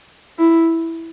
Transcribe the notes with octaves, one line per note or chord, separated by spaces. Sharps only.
E4